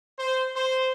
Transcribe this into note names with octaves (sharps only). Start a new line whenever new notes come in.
C5
C5